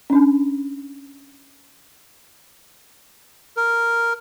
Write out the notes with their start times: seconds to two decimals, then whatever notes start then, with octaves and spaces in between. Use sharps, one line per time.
0.10 C#4 D4
3.57 A#4